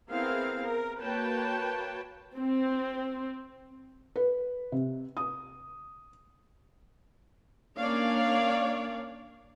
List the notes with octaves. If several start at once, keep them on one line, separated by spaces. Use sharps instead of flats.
B3 C4 E4 G#4 A#4 F5
A#4
A#3 F#4 B4 C#5 G5 A5
C4
B4
C3
D#6
A#3 C#4 D4 C#5 D5 F5